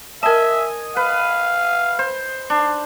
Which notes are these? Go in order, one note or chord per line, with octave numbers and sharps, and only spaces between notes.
A#4 D#5 E5 G#5 A5
B4 F5
C5
D4